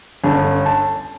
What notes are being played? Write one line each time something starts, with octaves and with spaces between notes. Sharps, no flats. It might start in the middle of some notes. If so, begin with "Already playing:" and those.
G1 D3 C#4 A5
A5